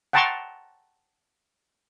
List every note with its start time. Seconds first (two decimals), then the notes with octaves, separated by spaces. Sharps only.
0.13 F#5 G5 A5 A#5 C6 C#6